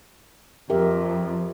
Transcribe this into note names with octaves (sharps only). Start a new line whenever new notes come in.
F2 G4 A#4 E5